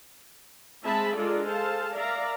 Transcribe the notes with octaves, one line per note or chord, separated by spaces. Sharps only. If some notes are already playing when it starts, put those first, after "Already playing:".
G#3 C4 G#4 E5 A5 B5
G#3 D4 F4 A4 A#4 D5
G#4 A4 C5 F5 A5
A#4 D5 E5 F5 A#5